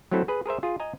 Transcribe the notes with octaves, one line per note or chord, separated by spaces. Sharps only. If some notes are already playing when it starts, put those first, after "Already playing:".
F#3 A3 C4 E4 A4
G#4 B4
G#4 A#4 C5 E5
F4 G#4
D#5 G#5 A#5